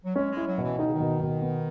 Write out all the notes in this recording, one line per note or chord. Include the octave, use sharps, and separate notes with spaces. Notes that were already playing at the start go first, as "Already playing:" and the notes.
F#3
G#3 C#4
G#3
E4
F#3
B2
E3
D#3 D#4
C#3
D#3
B2
B2
B3